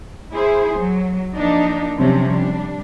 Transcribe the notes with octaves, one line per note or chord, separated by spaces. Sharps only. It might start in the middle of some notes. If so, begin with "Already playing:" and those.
E4 G#4 C5
F#3
F3 A#3 D4 D#4
C3 F3 F#3 C#4 D4
G3 D4